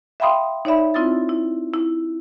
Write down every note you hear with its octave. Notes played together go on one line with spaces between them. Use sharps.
E5 F5 G5 B5 C6 D#6
D#4 C#5 D5 E5 B5
C4 E4 F4 D#6 E6 A6
E4
E4